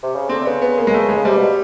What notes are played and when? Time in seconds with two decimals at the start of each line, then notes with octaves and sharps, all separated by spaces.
0.03 C3
0.15 C#3
0.29 D3 C4
0.45 C#3 B3
0.62 B3
0.78 A#3
0.87 G#3
0.94 A3
1.09 G#3
1.16 C#3
1.25 C3 G3
1.36 B2